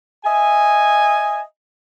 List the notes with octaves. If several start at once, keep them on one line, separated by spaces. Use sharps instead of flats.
D#5 E5 G#5